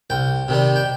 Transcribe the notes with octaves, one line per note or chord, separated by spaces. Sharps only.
C2 G5
C3 D#3 G3
G5